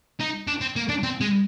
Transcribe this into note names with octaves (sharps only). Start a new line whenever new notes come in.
D#4
D4
C4
A#3
D4
C4
G#3